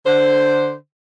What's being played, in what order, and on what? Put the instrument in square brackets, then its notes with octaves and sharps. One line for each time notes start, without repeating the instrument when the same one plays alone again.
[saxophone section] D3 C5